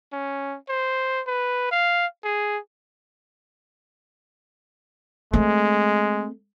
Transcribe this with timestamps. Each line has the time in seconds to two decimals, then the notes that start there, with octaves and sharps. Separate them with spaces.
0.13 C#4
0.69 C5
1.27 B4
1.72 F5
2.24 G#4
5.33 G#3 A3 C4